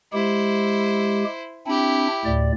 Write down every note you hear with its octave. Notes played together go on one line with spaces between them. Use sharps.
G#3 E4 G4 C5
C4 D4 E4 G4
D2 A2 D5